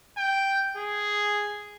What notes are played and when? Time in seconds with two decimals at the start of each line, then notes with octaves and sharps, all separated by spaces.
0.18 G5
0.77 G#4